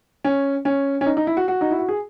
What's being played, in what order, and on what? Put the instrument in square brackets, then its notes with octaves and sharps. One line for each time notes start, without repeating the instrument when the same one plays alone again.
[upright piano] C#4
C#4
C#4
D#4
D#4
E4
F#4
F#4
D#4
E4
F#4
G#4